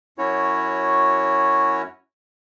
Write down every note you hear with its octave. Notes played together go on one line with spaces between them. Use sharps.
F#2 C#4 E4 F#4 C#5